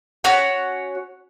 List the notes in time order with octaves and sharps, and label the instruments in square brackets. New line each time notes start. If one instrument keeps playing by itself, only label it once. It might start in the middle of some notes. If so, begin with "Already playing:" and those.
[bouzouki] C#4 F#4 C#5 F#5